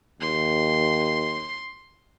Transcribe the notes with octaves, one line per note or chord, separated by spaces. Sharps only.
D#2 C6